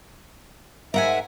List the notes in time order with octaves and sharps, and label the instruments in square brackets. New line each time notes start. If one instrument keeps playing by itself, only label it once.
[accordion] G#2 E5 [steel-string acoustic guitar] A#4 F#5 G#5